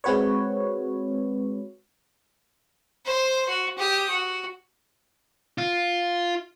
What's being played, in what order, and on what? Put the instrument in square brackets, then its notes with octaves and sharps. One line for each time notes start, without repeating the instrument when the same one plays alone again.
[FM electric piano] G#3 C4 F#4 B4 C#5
[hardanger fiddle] C5 C6
F#4
G4 D#6
F#4
[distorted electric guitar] F4